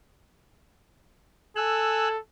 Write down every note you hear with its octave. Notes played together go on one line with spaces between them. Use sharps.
A4 G#5 E6 F#6